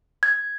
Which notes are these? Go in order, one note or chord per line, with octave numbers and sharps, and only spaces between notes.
G#6